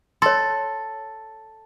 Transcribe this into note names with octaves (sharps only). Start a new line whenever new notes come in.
A4 C#5 C6